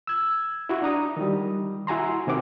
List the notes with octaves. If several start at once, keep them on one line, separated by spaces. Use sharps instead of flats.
E6 G#6
E4 F#4
D4 A#5 D#6
D#3 G3
E4 F#4 G#5 A#5 C6
C3 D#3 C4 F#4 F#5 D6